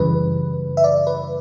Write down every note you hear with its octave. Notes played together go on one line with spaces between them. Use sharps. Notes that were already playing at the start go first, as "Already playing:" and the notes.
Already playing: F#2 C#3 E3 G3 B4
E5
D5
B4